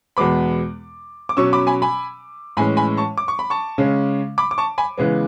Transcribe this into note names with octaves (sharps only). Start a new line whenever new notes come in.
E2 B2 G#3 B3 B5 D6
D6
B2 F#3 C#4 C#6 E6
B5 D6
G#5 B5
G#5 B5
A2 E3 G#3 C#4 G#5 B5
G#5 B5
A5 C#6
D6
C#6
B5
A5 C#6
C#3 G#3 C#4
B5 D6
D6
A5 C#6
G#5 B5
C#3 E3 G#3 B3